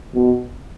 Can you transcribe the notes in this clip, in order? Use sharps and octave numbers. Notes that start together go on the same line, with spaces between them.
B2